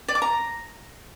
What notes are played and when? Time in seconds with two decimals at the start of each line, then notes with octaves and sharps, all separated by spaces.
0.08 D5
0.15 D6
0.22 A#5